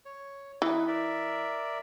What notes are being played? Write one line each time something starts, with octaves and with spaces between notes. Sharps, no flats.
C#5
E3 D#4 B4
A#4 D5 E5